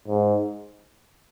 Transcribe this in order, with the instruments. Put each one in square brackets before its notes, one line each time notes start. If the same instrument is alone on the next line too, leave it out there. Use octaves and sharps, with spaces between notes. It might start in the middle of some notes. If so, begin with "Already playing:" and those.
[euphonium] G#2